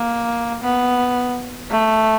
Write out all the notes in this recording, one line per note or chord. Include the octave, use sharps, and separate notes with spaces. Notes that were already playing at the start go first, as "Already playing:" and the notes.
Already playing: A#3
B3
A3